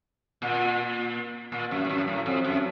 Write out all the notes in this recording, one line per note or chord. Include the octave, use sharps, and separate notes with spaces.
A#2
A#2
F#2
A2
F#2
A2
F2
F#2